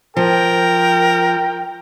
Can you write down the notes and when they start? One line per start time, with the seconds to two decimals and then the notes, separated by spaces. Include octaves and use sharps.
0.17 F3 A#4 G5